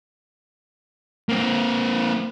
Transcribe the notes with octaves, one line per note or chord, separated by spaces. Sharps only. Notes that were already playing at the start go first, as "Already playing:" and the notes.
A#3 C4